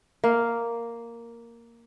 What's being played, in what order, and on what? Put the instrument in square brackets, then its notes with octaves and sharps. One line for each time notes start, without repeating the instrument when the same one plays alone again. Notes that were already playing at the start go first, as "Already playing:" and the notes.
[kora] A#3 F5